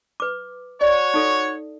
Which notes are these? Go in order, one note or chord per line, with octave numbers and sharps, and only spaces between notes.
B4 D6
F#4 C#5 D5
D#4 A4 E5